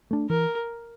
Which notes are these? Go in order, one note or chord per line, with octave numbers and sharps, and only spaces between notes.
A3 D4
E3 A#4